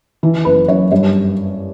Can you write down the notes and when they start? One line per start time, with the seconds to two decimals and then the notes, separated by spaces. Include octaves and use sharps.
0.23 E3
0.45 F#1 B4
0.68 F#2 C#5
0.92 G2 C#5